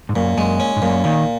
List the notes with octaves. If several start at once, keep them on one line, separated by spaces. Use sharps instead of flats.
G#2
F#2 A#2
F#2 G#3
C#4
G#2
F#2 A#2
A#2 D#3